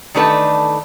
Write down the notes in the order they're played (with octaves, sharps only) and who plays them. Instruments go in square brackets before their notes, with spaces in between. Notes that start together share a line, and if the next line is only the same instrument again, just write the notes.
[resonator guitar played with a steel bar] D#3 E3 A3 D4 A4 B4